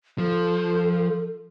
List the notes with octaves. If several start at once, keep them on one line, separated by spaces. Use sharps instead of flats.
F3 A4